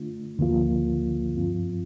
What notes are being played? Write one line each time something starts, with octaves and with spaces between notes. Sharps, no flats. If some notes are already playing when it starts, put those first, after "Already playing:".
Already playing: D3 A3 D4 F4
D2 D3 F3 A#3 F4
G2 F3 C4 F4